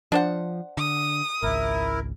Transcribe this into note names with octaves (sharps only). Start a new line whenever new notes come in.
F3 D4 C5 F#5
D3 D#6
G#1 C#2 E4 A#4